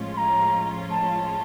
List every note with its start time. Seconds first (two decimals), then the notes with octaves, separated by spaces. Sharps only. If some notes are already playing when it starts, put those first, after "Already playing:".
Already playing: A2 F3 G#3 C#4 F4
0.14 C6
0.17 A#5
0.90 A5